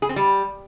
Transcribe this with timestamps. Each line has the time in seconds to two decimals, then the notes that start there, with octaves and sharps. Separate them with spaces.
0.02 G#4
0.09 C4
0.16 G3